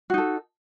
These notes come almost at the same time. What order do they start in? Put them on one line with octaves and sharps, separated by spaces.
F#4 D#4 A4